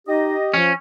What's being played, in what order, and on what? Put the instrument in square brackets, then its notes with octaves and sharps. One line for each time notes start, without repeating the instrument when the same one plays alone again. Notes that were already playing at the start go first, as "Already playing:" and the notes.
[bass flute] D#4 [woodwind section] G4 D#5
[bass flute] F3 [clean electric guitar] C#4